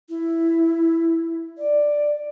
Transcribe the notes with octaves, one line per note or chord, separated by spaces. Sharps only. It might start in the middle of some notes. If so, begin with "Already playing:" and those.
E4
D5